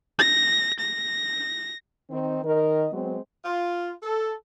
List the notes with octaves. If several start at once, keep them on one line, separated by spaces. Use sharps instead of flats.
A#6
A#6
D#3 C4 D#4
D#3 A#4 D#5
F#3 G#3 B3 C4
F4
A4